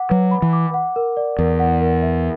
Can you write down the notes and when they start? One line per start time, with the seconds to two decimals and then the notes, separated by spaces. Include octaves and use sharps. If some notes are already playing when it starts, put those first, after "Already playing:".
Already playing: F#5 D6
0.10 F#3 B4
0.31 B5
0.42 E3
0.53 D6
0.74 F#5
0.96 A#4
1.17 D5
1.39 E2 A#4
1.59 F#5
1.81 A#4
2.03 E5